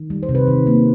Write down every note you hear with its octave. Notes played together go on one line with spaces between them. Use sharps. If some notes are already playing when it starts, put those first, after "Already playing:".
Already playing: D#3
G3
C5
C3
B4
D#3
A#3